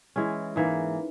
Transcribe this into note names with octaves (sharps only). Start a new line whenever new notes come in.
E3 G#3 C#4
G#2 E3 A#3